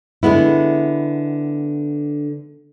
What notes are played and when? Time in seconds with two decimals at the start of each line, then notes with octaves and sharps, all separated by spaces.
0.23 D3 G#3 B3 E4